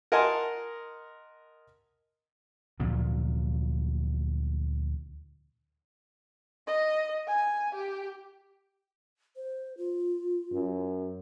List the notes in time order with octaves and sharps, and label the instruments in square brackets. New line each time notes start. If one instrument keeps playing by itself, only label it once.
[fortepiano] A#4 D#5 F#5 G#5 A5 C6
[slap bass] D2 A#2 F3 F#3
[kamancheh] D#5
G#5
G4
[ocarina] C5
F4
[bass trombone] F#2